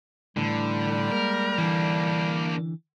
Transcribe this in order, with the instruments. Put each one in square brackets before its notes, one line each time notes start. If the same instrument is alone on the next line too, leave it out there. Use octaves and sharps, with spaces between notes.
[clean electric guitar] A2 E3 A4 [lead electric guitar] D3 [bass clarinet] G3
[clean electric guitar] G#3 A#3 [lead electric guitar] A#4
[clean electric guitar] D3 E3 [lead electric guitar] A#3 D4